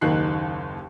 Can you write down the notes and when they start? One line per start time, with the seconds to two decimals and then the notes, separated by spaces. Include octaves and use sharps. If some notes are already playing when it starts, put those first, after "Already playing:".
0.01 F#1 D#2 D#3 F#6 C7